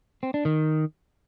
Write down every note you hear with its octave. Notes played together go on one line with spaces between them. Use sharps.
C4
D4
D#3